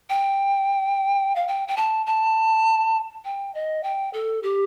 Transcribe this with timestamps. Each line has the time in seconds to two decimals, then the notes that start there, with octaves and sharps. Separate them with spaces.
0.10 G5
1.36 F5
1.48 G5
1.68 G5
1.77 A5
2.06 A5
3.25 G5
3.55 D#5
3.83 G5
4.13 A4
4.43 G4